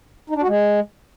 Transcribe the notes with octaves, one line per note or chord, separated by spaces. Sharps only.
D#4
D4
F#4
G#3